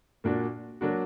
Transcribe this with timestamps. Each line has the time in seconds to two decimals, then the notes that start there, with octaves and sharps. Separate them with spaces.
0.24 A#2 A#3 D4 F#4
0.81 F#3 A#3 D4 F#4